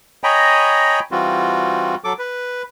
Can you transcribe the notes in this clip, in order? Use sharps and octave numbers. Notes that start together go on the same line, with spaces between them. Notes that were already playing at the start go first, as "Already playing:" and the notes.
C#5 D#5 G5 G#5 A#5 B5
E3 G3 C4 F4 F#4
F#3 A4 D6
B4